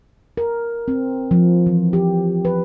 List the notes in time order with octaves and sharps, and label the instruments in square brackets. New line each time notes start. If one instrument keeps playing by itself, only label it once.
[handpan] A#4
C4
F3
E3
G4
B4